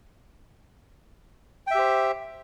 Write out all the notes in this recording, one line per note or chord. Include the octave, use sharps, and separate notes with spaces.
G4 C5 E5 G5